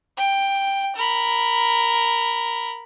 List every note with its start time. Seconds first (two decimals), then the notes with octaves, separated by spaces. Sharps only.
0.17 G5
0.96 A#4 B5